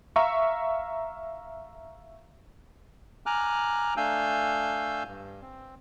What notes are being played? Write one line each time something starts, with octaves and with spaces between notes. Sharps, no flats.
E5 F5 A#5 C#6
G#5 A#5 D6 F6 F#6
A3 D4 F5 G#5 E6 G6
G2
C4